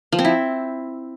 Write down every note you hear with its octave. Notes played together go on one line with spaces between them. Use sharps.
F3
C4
E4